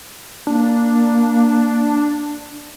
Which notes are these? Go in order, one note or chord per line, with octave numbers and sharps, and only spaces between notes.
A#3 D4